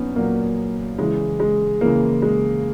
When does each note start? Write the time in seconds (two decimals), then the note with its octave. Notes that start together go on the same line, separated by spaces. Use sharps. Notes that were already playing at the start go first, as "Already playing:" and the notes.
Already playing: A#2 F#3 B3 C#4 D#4
0.16 A#2 F#3 A#3
0.99 C#3 E3 G#3
1.40 G#3
1.81 C#3 E3 A#3
2.22 G#3